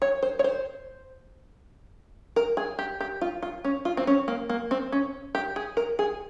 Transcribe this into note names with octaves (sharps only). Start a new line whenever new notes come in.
C#5
C5
C#5
C5
A#4
G#4
G4
G4
F4
F4
C#4
F4
C4
C#4
A#3
A#3
C4
C#4
G4
G#4
A#4
G#4